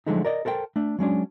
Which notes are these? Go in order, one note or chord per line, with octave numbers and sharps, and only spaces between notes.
D3 F3 F#3 G#3 A3 D#4
A#4 D5 D#5
A4 A#4 C5 E5 G5
A3 D4
F#3 G#3 C#4 D4